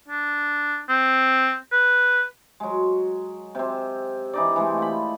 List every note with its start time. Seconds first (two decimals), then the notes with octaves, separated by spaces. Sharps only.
0.08 D4
0.89 C4
1.72 B4
2.60 F#3 G#3
3.55 C3 C4
4.33 E3 D#4 D5
4.56 E3 G#3 A3
4.78 F4 B5